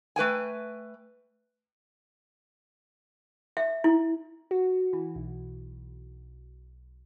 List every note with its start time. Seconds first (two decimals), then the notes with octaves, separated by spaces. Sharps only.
0.16 A3 B4 G5 G#5
3.57 E5
3.84 E4
4.51 F#4
4.93 E3
5.15 B1